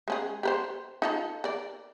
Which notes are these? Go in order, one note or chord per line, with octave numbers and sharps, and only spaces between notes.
G#3 C#4 G#4
G4 A#4 C5
D#4 F4 A4
A#4 D5